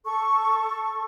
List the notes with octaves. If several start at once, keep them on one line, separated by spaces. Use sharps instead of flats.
A4 C#6